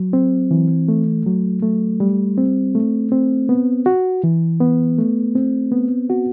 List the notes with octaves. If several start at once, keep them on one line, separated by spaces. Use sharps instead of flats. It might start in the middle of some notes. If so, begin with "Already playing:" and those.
Already playing: F#3
C4
E3
A3
F#3
A3
G3
C4
A3
C4
B3
F#4
E3
B3
A3
C4
B3
F#4